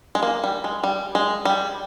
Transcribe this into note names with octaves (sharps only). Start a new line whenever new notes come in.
G#3
A#3
G3
G#3
G3
G#3
G3